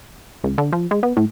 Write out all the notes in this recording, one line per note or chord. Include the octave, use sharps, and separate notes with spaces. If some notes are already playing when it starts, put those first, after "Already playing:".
C#2
D3
F3
G#3
B3
A2